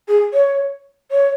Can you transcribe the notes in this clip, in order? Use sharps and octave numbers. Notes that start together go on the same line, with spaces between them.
G#4
C#5
C#5